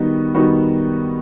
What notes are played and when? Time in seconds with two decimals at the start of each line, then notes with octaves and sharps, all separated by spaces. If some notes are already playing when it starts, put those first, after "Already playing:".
Already playing: D#3 G3 B3 D#4 F#4
0.35 D#3 G3 B3 D#4 F#4